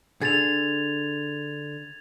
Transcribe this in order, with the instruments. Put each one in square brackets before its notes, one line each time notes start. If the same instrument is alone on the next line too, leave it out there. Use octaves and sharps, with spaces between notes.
[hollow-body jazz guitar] D3 G#4 [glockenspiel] G#6 A6 F7